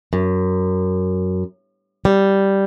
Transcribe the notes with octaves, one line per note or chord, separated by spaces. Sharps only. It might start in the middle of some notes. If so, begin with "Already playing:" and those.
F#2
G3